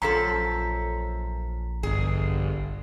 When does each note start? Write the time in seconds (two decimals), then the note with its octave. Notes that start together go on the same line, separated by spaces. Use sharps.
0.02 A#1 F#2 F3 A4 A#5 B6
1.83 G1 G#4